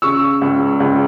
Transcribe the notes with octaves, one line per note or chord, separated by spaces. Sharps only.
C#3 C#6 E6
C#2
C#2